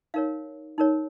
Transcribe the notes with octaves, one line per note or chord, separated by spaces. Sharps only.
D#4 A#4 C#5 F5
D#4 A#4 C#5